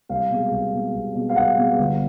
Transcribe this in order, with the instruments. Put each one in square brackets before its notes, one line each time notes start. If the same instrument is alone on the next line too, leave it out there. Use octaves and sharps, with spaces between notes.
[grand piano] C2 F5
B2 G#3
C2
B2 G#3
C2
B2 G#3
F5
C2 F#5
B2 G#3
G1